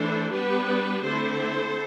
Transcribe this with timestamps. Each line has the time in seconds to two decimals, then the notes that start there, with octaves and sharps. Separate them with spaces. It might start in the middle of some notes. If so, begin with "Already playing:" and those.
Already playing: E3 A3 D4 A4 C5
0.30 G3 B3 D4 G4 B4
1.03 D3 A3 C4 E4 A4 C5